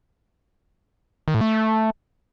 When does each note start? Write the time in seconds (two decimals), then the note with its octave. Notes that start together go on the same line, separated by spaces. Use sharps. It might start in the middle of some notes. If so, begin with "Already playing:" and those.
1.28 D#3
1.34 A2
1.41 A3